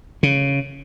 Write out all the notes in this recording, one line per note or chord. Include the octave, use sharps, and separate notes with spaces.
C#3